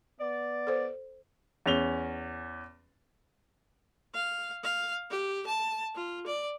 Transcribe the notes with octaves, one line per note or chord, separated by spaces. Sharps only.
B3 D5
A4 C5
E2 C#4 F7 G7
F5
F5
G4
A5
F4
D5